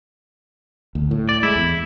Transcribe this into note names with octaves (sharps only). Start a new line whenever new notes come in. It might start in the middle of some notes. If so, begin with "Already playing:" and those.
D2
A2
D5
G#3 E4
E2